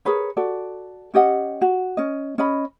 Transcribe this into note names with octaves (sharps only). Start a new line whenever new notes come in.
G#4 A#4 B4 C#5
F#4 A4 D5
C#4 G4 D#5 F#5
F#4
C#4 D#5
C#4 D#5 B5